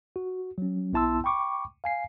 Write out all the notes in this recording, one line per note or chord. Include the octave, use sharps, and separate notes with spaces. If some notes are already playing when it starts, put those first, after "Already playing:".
F#4
F#3 C#4
B1 B3 E4 A5 C6 E6
G5 B5 C#6 D6
F5 G#5 C7